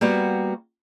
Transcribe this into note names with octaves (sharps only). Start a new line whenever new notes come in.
G3 A#3 B3 F#4 G4